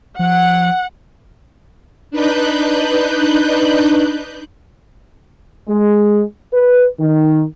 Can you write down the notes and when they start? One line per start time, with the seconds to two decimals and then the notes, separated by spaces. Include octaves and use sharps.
0.19 F3 F#5
2.11 D4 D#4 B4 F#6 G6
5.68 G#3
6.53 B4
6.99 D#3